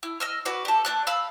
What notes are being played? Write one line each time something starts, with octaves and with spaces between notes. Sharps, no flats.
E4
D#5 E6 F6
F#4 B4 D5
G4 A4
A3 D4 F#6
F5 B5 E6